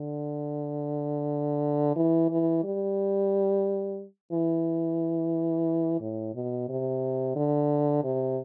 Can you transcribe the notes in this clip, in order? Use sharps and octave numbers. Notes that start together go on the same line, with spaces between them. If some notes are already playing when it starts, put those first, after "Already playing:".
Already playing: D3
E3
E3
G3
E3
A2
B2
C3
D3
C3